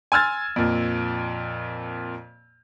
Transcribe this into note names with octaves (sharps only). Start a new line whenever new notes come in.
G#5 C6 E6 F6 G#6 A6
F2 A#2